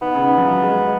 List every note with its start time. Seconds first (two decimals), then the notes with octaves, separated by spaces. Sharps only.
0.01 D#3 B3
0.15 C#3
0.22 D#3
0.38 F3
0.44 F#3
0.64 G#3